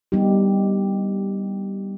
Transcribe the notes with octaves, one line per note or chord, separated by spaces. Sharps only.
G3 B3 D#4 G4